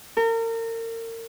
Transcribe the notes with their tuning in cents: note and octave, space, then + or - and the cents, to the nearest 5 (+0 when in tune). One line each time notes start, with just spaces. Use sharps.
A#4 -35